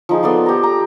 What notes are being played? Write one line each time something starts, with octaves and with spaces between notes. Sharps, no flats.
F3 D#4 G#4
B3 A4 D5 C6
G4 A#5
A#5